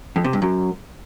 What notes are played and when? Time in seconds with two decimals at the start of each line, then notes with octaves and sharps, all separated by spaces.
0.16 F2
0.24 C3
0.33 G2
0.42 F#2